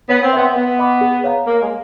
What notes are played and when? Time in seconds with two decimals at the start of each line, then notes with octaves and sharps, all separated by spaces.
0.09 B3 C#5
0.23 C4
0.33 B3 E5 G5 C6
0.56 B3 B4
0.79 D#5 F#5 B5 D6
1.01 G#4
1.24 C#5 F5 A#5
1.46 A#3 A#4
1.62 G#3